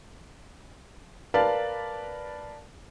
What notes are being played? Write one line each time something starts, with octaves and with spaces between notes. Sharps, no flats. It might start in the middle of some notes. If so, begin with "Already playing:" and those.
A#4 B4 D5 F5 A5